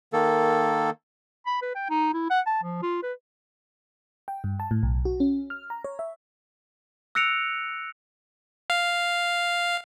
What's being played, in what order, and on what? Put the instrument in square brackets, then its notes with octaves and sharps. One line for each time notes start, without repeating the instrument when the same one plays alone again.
[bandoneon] D#3 A#3 A4
[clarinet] B5
B4
G5
D#4
E4
F#5
A5
F3
F4
B4
[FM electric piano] G5
G2
A5
A2
B1
F#4
C#4
F6
A#5
C#5
E5
[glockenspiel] E6 F#6 A#6 C#7 D7 F7
[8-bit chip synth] F5